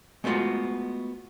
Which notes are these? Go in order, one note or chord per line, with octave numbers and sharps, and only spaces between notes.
G#3 A3 B3 C#4 F4 F#4